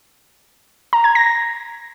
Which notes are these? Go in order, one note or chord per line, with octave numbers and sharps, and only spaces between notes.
A#5
G#6
A#6